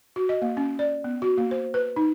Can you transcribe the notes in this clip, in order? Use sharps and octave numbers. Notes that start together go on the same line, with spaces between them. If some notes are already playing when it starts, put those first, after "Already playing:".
F#4
D#5
A#3
C#4
D5
B3
F#4
A#3
C5
B4
D#4